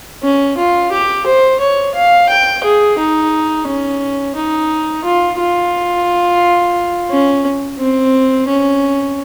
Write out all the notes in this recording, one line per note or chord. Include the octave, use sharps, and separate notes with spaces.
C#4
F4
G4
C5
C#5
F5
G5
G#4
D#4
C#4
D#4
F4
F4
C#4
C4
C#4